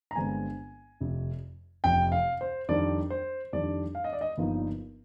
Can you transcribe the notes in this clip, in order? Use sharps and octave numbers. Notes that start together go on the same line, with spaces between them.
A#5
G1 G2 D3 G#3 C4 G#5
F1 F2 C3
F1 F2 C3 G5
F5
C5
F2 D#3 G3 D4 D5
C5
F2 D#3 G3 D4 D5
F5
D#5
D5
D#5
G1 G2 F3 A#3 D#4